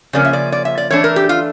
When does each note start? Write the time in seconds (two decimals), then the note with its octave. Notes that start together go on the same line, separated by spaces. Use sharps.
0.13 C#3 F3 A#3 C#4 D5
0.25 E5
0.33 D5
0.52 D5
0.65 E5
0.78 D5
0.90 E3 A3 D4 C#5
1.04 A#4
1.16 G4
1.29 F4